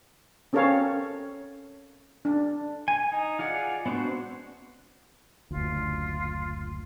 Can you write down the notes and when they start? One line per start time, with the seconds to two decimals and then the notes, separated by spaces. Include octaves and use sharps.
0.53 C4 C#4 A4 A#4 C#5 F5
2.25 D4
2.88 G#5
3.12 D#4
3.39 F4 G#4 D5 F#5
3.86 B3 C4 D4 F#4 C5
5.51 F#1 D2 F4